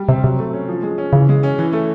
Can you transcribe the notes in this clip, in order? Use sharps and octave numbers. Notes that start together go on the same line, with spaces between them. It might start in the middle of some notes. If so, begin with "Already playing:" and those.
Already playing: G3
C3 C4
C3 F#3
A3
C#4
F3
G#3
C#4
C#3 E3
G#3
C#4
E3
A3